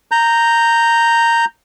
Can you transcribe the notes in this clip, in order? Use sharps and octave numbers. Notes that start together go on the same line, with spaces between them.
A#5 G6